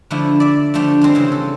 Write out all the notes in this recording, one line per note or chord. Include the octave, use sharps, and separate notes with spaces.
D3 F3 A3 D4 E4
D5 E5
D3 F3 A3 D4 G4
G3 G#3 C4
C#3 E3 C4
A4